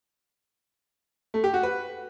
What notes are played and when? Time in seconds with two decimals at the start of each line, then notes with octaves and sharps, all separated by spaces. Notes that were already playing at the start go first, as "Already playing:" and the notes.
1.34 A3
1.44 G4
1.54 F#4
1.63 B4